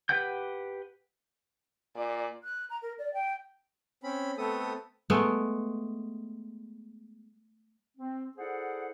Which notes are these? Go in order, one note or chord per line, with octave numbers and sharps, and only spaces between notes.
G4 B4 F#5 G5 G6
A#2 D5
F#6
A#5
A#4
D5
G5
C4 C#4 B5
A3 B3 C4 A4 D#6
G#3 A3 B3
C4
E4 G#4 A4 C5 D5 F#5